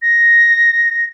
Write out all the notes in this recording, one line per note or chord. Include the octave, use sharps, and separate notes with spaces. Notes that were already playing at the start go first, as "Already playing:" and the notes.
A#6